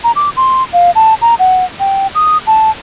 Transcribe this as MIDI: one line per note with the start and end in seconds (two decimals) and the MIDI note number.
0.04 0.12 82
0.16 0.30 86
0.37 0.63 84
0.73 0.91 77
0.95 1.14 81
1.22 1.34 82
1.39 1.65 78
1.80 2.07 79
2.15 2.38 87
2.47 2.71 81